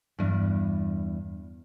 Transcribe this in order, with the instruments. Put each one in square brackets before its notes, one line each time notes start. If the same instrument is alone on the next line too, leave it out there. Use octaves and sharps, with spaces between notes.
[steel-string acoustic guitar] E2 G2